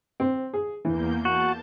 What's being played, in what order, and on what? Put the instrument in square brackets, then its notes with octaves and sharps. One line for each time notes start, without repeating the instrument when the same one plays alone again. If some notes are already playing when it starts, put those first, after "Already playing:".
[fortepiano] C4
G#4
[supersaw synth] E2 A#3 G6 [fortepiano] E3
[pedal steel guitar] F#4 [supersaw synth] A5